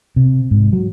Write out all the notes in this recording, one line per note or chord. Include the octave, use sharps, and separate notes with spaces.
C3
G#2
F#3